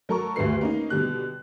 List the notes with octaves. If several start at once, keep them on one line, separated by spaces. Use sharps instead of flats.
F#3 A4 A#4 C#6
D2 G2 D3 B4 C7
A#3 C#4 D#4
B2 D3 G3 F#6